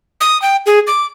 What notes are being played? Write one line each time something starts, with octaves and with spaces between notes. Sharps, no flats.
D#6
G5
G#4
D6